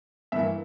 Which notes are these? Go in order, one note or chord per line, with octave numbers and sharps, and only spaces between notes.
G2 E3 A#3 E5